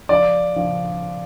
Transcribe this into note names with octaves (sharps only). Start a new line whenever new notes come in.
F3 D5
F3